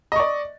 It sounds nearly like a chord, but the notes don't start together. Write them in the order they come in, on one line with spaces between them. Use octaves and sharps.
D#5 C#6 D5